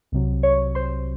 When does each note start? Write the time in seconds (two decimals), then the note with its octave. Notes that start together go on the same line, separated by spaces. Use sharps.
0.12 C2 C3 F#3
0.43 C#5 C#6
0.75 C5 C6